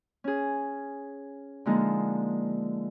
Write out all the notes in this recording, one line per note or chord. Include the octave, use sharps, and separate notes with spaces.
C#4 G#4
D3 F3 G#3 A#3 D#4